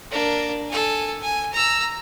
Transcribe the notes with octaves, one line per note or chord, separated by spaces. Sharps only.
A#3 D4
A4 G#5
G#5
A#5 E6